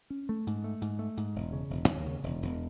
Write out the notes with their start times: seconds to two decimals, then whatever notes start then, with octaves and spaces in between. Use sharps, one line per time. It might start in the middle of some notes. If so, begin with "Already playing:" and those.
0.10 C#4
0.29 A3
0.47 G#2
0.64 A3
0.81 G#2
0.99 A3
1.17 G#2
1.35 E1
1.52 C#3
1.70 E1
1.88 D#2
2.06 C#3
2.23 E1
2.42 E1